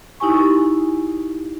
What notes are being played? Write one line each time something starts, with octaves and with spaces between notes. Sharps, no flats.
D#4 E4 G4 G#5 C#6